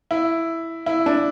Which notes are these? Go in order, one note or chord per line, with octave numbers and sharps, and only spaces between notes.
E4
E4
D4